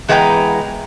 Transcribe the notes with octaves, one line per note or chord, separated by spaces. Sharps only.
E3 G#3 B3 C5 G5 A#5